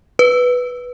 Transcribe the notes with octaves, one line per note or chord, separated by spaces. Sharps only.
B4